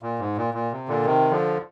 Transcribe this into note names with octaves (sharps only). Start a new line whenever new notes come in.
A#2
G#2
A#2
A#2
C3
A#2 D3
C3 D#3
D3 F3